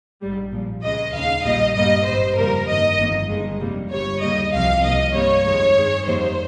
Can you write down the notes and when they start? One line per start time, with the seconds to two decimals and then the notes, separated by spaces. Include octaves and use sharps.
0.21 A#1 G#2 G3
0.52 A#1 A#2 F3
0.82 C#2 C#3 G#3 D#5
1.13 D#2 C#3 G#3 F5
1.44 A#1 A#2 G3 A#3 D#5
1.75 G2 G3 A#3 D#5
2.06 G#1 G2 G3 C5
2.37 F2 C#3 G3 A#3 A#4
2.68 G2 D#3 A#3 D#5
2.98 G1 F2 D#3 A#3
3.29 G1 G2 D#3 G#3
3.60 F2 C3 G3 A#3
3.91 G1 G2 G3 C#5
4.22 D#2 C#3 G3 A#3 D#5
4.53 C2 C3 F3 F5
4.83 C2 C3 F3 A#3 D#5
5.14 G2 G3 A#3 C#5
5.45 F2 D#3 G#3
5.76 G2 D#3 G#3
6.06 F2 D#3 G3 A#3 C5